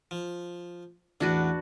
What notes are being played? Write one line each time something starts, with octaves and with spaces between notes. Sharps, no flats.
F3
A1 E2 D4 F#4 B4